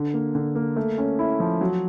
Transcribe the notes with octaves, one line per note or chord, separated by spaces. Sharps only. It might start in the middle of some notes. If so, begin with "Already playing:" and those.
Already playing: D3
A#3
D3
A#3
A3
C#4
E4
F3
F#3